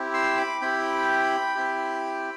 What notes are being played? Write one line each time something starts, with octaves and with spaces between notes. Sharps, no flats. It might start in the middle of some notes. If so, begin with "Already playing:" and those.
Already playing: C4 E4 G4
C6 E6
B5 D6
C4 E4 G4 G5 B5
C4 E4 G4